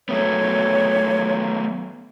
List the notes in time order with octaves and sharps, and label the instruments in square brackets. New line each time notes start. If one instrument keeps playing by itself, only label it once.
[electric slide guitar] F#3 A3 B3 [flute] C#5